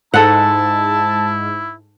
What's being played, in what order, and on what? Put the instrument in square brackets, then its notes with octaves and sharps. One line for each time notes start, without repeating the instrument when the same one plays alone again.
[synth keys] G#2 [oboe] E4 [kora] A4 F#5 [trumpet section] A5